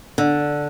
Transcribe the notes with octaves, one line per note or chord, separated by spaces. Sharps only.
D3